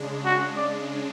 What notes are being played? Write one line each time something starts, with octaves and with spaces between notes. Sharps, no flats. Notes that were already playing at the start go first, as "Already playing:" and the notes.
Already playing: C#3 G#3 D4
F#4
D5